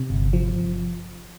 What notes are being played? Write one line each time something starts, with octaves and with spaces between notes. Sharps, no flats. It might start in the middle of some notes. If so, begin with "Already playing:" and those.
Already playing: C3
G1
F3